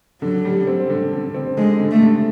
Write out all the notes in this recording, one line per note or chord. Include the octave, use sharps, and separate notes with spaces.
D3 F#3
G3
C4
D3
D3
C4
D3 G#3
D3
A3
D3